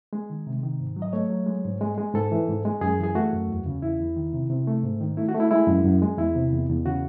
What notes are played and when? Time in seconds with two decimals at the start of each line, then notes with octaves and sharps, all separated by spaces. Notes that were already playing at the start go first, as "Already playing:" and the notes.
0.13 G#3
0.30 D#3
0.47 C3
0.63 D#3
0.80 G#2
0.96 F#3
1.02 D#5
1.13 A3 C#5
1.30 F#3
1.46 G#3
1.64 G#2
1.81 G#3
1.98 G#3
2.14 G#2 A4
2.32 E3
2.48 G#2
2.65 G#3
2.81 F#2 G#4
2.99 E3 G#4
3.15 A3 F#4
3.33 F#2
3.48 E2
3.66 C#3
3.82 E2 E4
3.99 E2
4.17 D#3
4.33 C3
4.50 C3
4.67 A3
4.83 G#2
5.01 D#3
5.17 A3 E4
5.29 F#4
5.35 A3
5.40 E4
5.51 G#3 E4
5.68 F#2
5.84 F#2
6.02 G#3
6.18 E2 E4
6.36 C3
6.52 E2
6.69 E2
6.85 C#3 F#4